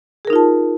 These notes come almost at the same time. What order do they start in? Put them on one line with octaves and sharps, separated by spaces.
G#4 A#4 D#4 F4 A5